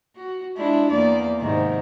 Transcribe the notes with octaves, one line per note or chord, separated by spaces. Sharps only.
F#4
G#3 D4 E4
E2 A#3 D5
G#2 C3 D#3